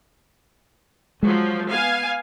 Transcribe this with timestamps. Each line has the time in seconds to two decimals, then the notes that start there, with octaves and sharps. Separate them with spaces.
1.23 F3 F#3 G#3
1.68 B3 F5 G#5